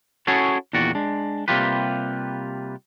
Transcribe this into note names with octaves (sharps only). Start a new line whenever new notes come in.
C#4 E4 F#4 G#4 A4 C#5
E2 A#2 D#3 F#4 D5
G#3 D4
C3 G3 A#3 F4 G4 B4